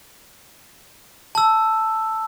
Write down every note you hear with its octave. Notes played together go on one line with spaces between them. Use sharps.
A5 E6